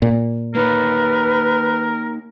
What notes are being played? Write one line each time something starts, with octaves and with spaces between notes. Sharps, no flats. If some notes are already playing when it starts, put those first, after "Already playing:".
A#2
A#3 D#4 A#4 B4 C#5